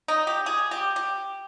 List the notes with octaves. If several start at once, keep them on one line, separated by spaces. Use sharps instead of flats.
D#4
G4
G#4
G4
G4